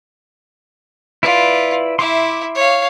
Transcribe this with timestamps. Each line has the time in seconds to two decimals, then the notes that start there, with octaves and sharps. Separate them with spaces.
1.23 E4 F4 B4 D5
1.99 E4 E5 C6 D6
2.55 C#5 F5